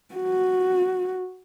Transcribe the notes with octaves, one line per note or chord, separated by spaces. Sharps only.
F#4